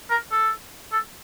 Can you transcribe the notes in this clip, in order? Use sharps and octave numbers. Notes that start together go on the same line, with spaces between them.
A#4
A4
A4